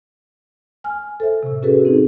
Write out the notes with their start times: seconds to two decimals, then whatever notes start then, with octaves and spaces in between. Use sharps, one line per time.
0.84 G#5 F6
1.20 A4 C5 E5
1.43 A2 C3
1.63 C#4 F#4 G#4 A4 B4
1.85 C4 D#4 G#4